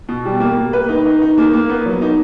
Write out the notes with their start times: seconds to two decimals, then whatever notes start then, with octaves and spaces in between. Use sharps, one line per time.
0.09 B2
0.25 G3
0.40 A#3
0.57 A#3
0.73 B4
0.89 D#4
1.06 D#4
1.22 D#4
1.38 A#3
1.53 A#3
1.70 B3
1.86 F#3
2.02 D#4